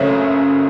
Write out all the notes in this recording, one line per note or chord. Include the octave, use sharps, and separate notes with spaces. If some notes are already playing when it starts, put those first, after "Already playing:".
Already playing: F#1 F#2 C#3 A3 C#4 E5